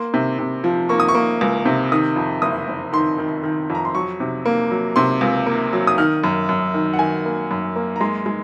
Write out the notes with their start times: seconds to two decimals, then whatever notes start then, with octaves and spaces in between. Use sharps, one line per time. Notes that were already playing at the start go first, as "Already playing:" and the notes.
Already playing: A#3 C6
0.14 C3
0.39 C3
0.64 F3
0.89 A#3 C#6
1.00 D#6
1.08 C#6
1.15 A#3
1.41 C#2
1.65 C3
1.92 D#3 D#6
2.16 F2
2.42 F#1 D#6
2.68 F#1
2.93 D#3 C6
3.18 D#3
3.43 D#3
3.70 F2
3.75 A#5
3.85 C6
3.95 F#3 C#6
4.20 C3
4.46 A#3
4.71 F#3
4.96 C3 C6
5.21 C#2
5.46 A#3
5.73 F#3
5.87 D#6
5.98 D#3 F6
6.24 F#2
6.49 F#2
6.74 D#3
6.93 F#5
6.99 D#3 G#5
7.25 A#3
7.51 F#2
7.76 A#3
7.96 A#5
8.00 G#3 C6
8.26 G#3